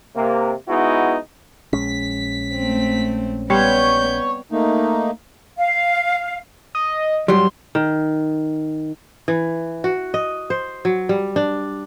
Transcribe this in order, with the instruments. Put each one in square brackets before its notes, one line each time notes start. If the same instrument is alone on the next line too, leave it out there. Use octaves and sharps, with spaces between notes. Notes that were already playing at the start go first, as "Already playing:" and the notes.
[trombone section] C3 A#3
G#3 B3 D#4 E4 F#4
[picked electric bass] A#1 G#3 C#4 [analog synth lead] B6
[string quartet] A3 C4
[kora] G3 C4 F5 [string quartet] B3 G6 [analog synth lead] C#5
[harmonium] A3 A#3 D#4
[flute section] F5
[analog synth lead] D#5
[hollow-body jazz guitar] G#2 F#3 G3 [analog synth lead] C6
[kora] D#3
E3
F#4
D#5
C5
F#3
G3
D4